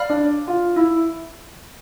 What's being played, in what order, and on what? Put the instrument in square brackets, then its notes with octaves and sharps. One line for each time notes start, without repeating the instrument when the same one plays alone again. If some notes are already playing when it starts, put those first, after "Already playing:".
Already playing: [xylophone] D5 F5 B5 F6
[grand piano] D4
F4
E4